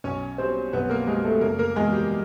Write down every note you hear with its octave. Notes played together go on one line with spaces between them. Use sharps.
B1 C#4 C#5
B2 G3 C4 C5
B1 B3 B4
A#3 A#4
B2 G3 G#3 G#4
A3 A4
F#1 A#3 A#4
A#3 A#4
E2 B2 G#3 G#4
G3 G4